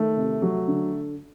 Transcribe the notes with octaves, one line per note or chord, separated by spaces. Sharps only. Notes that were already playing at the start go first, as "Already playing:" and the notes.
Already playing: D#3 A3
C3
F#3
D3